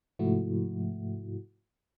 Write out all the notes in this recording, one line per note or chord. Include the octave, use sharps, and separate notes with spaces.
G#2 C3 F3 A3 E4 F#4